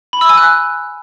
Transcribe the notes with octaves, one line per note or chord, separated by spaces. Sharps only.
B5
E6
G#5
F#6